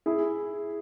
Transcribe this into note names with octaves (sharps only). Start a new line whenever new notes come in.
E4 G#4